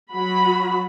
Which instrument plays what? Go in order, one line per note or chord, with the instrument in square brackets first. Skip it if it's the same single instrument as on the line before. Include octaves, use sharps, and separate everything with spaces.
[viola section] F#3 F#4 B5